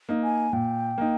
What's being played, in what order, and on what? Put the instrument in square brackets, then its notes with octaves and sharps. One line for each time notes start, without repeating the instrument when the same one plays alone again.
[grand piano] A#3 D#4
[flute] G#5
[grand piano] A#2 [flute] G5
[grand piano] A#3 D#4